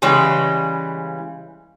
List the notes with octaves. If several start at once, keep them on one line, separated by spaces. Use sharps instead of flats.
C#3 E3 G3 G#3